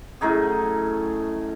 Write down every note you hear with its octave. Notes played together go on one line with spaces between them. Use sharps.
F#2 A2 D#4 G#4